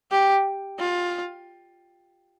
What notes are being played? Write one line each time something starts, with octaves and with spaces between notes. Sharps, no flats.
G4
F4